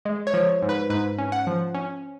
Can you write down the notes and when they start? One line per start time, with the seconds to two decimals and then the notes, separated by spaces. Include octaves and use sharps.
0.05 G#3
0.27 C#5
0.33 F3
0.62 G#2
0.69 B4
0.90 G#2 B4
1.18 C#4
1.32 F#5
1.47 F3
1.75 C#4